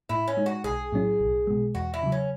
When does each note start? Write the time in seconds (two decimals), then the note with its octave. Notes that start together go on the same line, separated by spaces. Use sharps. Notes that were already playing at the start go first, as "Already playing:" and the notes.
0.09 A2 E4
0.28 C#4
0.37 G#3 D#4
0.46 F#4
0.64 B1 G#4
0.92 A2 F#3 C#4 E4
1.20 B1
1.47 B2 G#3
1.75 E2 F#4
1.94 E4
2.03 C#3 F#3
2.12 C#4